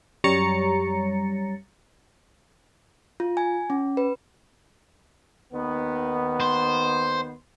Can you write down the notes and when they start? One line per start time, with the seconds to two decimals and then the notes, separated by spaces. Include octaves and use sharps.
0.24 F#2 G3 C#5 A#5 A6 C#7
3.20 F4
3.37 G#5
3.70 C#4
3.97 B4
5.52 D#2 D#3 B3
6.40 C5